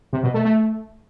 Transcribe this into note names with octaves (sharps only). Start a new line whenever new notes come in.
C3
B2
A3
A3